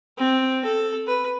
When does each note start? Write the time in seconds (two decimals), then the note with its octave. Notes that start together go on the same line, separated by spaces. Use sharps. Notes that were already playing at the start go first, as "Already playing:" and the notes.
0.18 C4
0.65 A4
1.07 B4